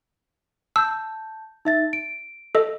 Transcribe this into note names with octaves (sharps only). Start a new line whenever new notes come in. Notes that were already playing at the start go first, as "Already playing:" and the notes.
A5 E6 G6
D#4 E5 A6
D7
A4 D#5